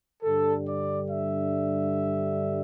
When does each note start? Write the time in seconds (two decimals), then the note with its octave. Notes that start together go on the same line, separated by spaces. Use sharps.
0.23 G2 D3 G3 A4
0.67 D5
1.10 E5